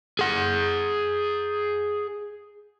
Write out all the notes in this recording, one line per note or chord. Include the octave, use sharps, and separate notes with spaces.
G#4 F#5